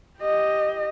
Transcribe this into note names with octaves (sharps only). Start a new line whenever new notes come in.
G4 D#5